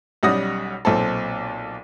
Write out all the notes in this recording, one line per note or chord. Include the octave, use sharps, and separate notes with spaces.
B1 G3 C#4 F#5 D#6 A#6
B1 A#2 C4 A4